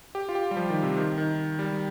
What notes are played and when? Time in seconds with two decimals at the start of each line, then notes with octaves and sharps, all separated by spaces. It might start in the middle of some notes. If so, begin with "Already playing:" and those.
0.15 G4
0.29 F4
0.35 G4
0.51 G3
0.56 F3
0.70 D#3
0.83 C3
0.97 D#3
1.18 D#3
1.59 G3